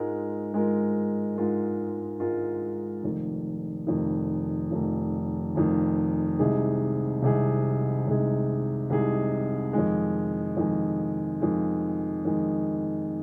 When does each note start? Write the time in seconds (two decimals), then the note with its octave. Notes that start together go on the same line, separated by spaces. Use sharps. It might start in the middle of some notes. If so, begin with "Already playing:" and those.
Already playing: G#2 G#3 F4 A#4
0.53 G#2 G#3 F4 A#4
1.36 G#2 G#3 F4 A#4
2.20 G#2 G#3 F4 A#4
3.03 F1 F2 D#3
3.87 F1 F2 D#3
4.71 F1 F2 D#3
5.55 F1 F2 D#3
6.39 C2 C3 G#3 D#4 G#4
7.22 C2 C3 G#3 D#4 G#4
8.06 C2 C3 G#3 D#4 G#4
8.90 C2 C3 G#3 D#4 G#4
9.73 F2 D#3 G#3
10.57 F2 D#3 G#3
11.41 F2 D#3 G#3
12.25 F2 D#3 G#3